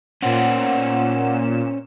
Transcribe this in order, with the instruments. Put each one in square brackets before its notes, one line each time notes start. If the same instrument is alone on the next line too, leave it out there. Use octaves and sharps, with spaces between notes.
[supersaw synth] A#2 E7 [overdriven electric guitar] C#4 C5 [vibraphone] F#5